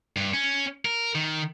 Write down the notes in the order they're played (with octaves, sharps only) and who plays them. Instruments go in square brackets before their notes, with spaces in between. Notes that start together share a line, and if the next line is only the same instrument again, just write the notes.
[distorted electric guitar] G2
C#4
A#4
D#3